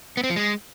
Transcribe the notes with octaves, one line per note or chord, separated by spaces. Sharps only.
B3
C4
F3
G#3